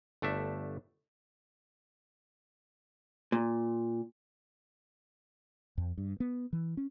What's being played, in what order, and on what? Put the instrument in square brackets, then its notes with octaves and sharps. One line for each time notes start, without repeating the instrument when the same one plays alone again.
[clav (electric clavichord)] G1 A3 D4 E5
[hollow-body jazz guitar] A#2
[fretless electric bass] F2
G2
B3
E3
C#4